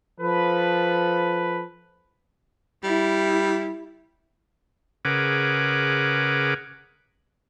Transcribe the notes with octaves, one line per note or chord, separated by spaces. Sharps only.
F3 A4 B4
G3 E4
C#3 G#4 A#4 B4 F#5 D6